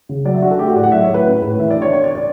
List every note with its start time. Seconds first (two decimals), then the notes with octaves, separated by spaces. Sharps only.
0.09 C#3
0.25 F#3 D5
0.34 E5
0.42 D4 F#4
0.51 A4
0.58 A3 G4
0.68 F#4
0.76 A2 D5
0.83 F#5
0.92 F#3 E5
1.04 A2 C#5
1.14 B4
1.26 C#4 B4
1.42 A2 B4
1.59 E3 E5
1.71 D5
1.76 D4
1.82 C#5
1.93 B3 C#5
2.04 D5
2.15 D5